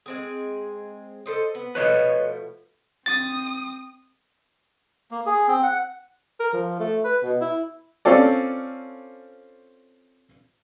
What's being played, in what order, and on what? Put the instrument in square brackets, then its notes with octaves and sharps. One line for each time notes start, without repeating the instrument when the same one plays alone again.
[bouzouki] G#3 C4 G#4
A4 C5 D#5
B3
[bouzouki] B2 F3 A3 [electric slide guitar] B4 C#5 D#5
[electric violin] C4 D#6 [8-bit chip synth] A6
[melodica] A#3
G#4
C4
F#5
[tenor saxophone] A#4
F3
A3
B4
B2
E4
[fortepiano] C4 C#4 F4 A4 D5